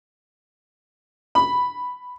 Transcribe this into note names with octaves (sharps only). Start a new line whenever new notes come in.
B5